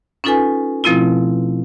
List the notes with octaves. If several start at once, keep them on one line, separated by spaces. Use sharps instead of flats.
C#4 D#4 F4 A4 B4 G#5
B2 F3 A3 C4 E4 F4